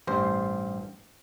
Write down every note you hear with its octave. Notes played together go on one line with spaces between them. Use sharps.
A1 G2 C5